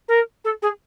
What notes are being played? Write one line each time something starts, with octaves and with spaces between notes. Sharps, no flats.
A#4
A4
G#4